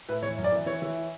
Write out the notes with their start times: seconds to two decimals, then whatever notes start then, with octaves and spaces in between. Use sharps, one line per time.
0.09 A2 B4
0.22 E3 C#5
0.38 F#2
0.44 D5
0.52 E3
0.66 E3 C#5
0.82 E3